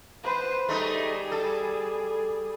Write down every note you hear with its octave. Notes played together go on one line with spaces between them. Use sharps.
B4 C5
G3 A3 D#4 G#4
A4